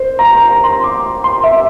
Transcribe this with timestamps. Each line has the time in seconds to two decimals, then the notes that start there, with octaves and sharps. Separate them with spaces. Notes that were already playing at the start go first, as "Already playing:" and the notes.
Already playing: C5
0.19 A#5
0.33 A#5
0.48 A#5
0.64 C6
0.84 D6
1.24 C6
1.44 E5